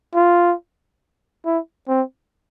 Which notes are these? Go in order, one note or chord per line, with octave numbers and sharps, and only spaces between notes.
F4
E4
C4